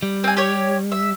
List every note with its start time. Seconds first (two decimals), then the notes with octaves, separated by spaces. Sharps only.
0.03 G3
0.24 C4 G#5
0.37 G4 C#5
0.92 E5